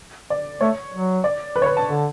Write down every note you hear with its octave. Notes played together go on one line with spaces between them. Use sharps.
D5
A3 C#5
F#3
D5
B4
C#5
B4
A5
D3